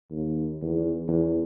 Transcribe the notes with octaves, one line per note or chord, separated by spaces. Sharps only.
D#2
E2
E2